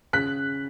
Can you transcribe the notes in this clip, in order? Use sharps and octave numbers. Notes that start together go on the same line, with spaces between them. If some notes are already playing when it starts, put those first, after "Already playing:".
C#3 F#6 B6